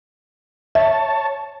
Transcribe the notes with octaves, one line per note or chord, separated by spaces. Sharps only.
C#5 E5 A5